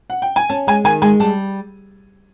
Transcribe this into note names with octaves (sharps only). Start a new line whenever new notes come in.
F#5
G5
G#5
C#4 A5
G#3 G#5
D#3 G#5
G#3 G#5
G3 A5